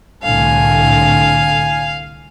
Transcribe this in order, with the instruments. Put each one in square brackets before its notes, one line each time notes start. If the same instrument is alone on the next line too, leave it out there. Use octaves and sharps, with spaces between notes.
[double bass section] C2 A2 D3 [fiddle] F5 [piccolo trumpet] G#5